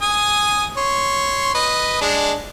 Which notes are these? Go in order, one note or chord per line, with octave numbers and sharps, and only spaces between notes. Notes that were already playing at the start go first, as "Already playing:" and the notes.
G#5 D#6
C#5 C6
B4 D#5
G#3 D4